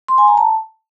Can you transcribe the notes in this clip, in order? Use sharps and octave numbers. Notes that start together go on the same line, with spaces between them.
C6
G#5
A#5
A5